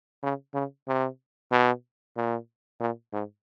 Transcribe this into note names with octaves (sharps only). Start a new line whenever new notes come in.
C#3
C#3
C3
B2
A#2
A#2
G#2